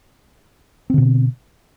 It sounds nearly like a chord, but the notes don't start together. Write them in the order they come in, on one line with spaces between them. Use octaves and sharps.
C4 D3 B2